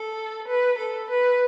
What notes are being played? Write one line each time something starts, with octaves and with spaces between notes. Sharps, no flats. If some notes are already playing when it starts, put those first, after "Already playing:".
Already playing: A4
B4
A4
B4